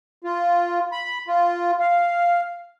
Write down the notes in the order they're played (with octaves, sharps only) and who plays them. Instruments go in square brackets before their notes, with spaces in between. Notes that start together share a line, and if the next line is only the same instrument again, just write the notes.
[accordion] F4
B5
F4
F5